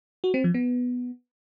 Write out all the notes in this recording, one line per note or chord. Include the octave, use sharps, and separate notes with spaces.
F#4
C4
F3
B3